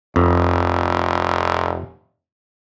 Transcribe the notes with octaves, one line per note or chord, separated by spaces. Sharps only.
F1 F2